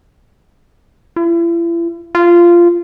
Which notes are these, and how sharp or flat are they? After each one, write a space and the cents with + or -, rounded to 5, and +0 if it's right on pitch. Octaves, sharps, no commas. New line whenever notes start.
E4 +40
F4 -15